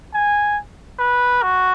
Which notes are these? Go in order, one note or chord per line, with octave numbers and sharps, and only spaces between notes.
G#5
B4
F#4